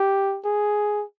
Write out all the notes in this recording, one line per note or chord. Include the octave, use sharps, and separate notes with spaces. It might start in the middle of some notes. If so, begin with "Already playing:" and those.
Already playing: G4
G#4